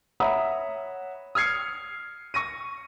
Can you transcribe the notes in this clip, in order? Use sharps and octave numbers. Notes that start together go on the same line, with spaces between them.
C#5 E5 F#5 A#5 B5 D#6
D#6 F6 G#6 C7 C#7
C#6 A#6 D#7